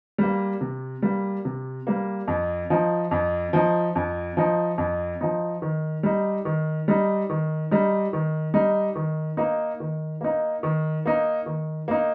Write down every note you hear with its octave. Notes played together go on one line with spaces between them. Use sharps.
G3 A#3
C3
G3 A#3
C3
G3 A#3
F2
F3 D#4
F2
F3 D#4
F2
F3 D#4
F2
F3 D#4
D#3
G3 D#4
D#3
G3 D#4
D#3
G3 D#4
D#3
G3 D#4
D#3
A#3 D#4
D#3
A#3 D#4
D#3
A#3 D#4
D#3
A#3 D#4